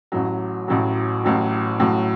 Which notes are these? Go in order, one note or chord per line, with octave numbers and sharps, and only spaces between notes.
A1 A2 F#3
A1 A2 F#3
A1 A2 F#3
A1 A2 F#3